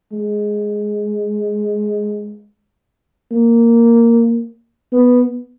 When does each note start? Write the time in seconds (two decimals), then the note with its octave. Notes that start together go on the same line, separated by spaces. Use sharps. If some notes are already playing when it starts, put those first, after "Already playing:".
0.12 G#3
3.32 A#3
4.92 B3